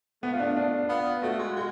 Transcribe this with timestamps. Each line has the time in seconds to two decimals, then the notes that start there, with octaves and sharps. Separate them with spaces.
0.23 A3 B3
0.33 F4
0.40 D4
0.57 D4
0.89 B3 F4
1.22 A3 F#4
1.39 G#3
1.49 F#4
1.56 G#3